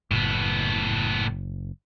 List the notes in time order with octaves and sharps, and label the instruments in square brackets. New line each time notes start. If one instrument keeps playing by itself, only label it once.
[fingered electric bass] F#1 [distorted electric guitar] A2 B3